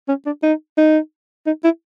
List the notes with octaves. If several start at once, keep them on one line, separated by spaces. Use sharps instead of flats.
C#4
D4
D#4
D#4
D#4
E4